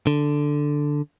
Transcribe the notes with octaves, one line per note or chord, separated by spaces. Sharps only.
D3